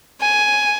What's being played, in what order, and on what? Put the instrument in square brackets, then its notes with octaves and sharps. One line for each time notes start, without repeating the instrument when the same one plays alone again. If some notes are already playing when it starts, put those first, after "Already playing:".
[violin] G#5